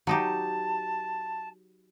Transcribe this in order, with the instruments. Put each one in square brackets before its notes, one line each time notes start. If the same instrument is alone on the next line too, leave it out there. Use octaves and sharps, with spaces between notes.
[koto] F#3 D#4 G4 [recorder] A5